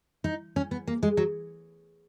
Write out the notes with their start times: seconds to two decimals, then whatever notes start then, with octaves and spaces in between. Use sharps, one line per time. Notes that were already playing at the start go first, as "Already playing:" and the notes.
0.24 D#4
0.56 C#4
0.71 B3
0.87 A#3
1.03 G#3
1.17 F#3